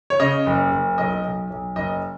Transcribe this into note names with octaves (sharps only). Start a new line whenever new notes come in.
C#5
C#3 D#5
F#1
F#1
B1 D#5
B1
B1
F#1 D#5